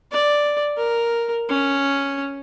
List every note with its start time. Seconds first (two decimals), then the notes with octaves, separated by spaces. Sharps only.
0.12 D5
0.77 A#4
1.49 C#4